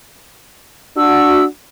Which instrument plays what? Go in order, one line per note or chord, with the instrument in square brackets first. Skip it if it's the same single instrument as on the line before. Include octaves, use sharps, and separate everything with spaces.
[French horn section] D4 F#4 [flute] E6